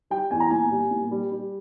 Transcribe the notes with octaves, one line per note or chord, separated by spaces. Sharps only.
G3 G5
E2 G#5
A#5
A#2 G#5
G3
A#2
G3
G3